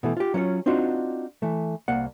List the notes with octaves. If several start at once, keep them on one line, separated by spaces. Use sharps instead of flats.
B2 E3 A3
F4 G4
F#3 C#4 F4 C#5
C4 D4 D#4 F4 F#4
E3 A3
C2 A#3 D5 F#5